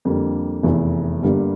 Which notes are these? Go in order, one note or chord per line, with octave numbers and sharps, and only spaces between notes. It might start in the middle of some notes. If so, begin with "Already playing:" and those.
F2 D3 G3 A#3 D4
F1 E2 E3
G1 G2 D3 G3 A#3